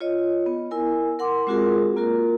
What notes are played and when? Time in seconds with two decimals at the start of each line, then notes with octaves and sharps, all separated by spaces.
0.01 F4 C#5 D#5
0.46 B3
0.71 E4 A#4 G#5
1.19 A#4 F#5 C6 D6
1.47 G#3 C4 F4 F#4 G#4 A#4
1.96 A#3 F4 F#4 A#4